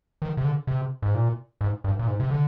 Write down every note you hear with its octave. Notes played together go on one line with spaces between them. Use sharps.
D#3
C3
D3
C3
G#2
A#2
G#2
G2
A#2
G#2
C3
D3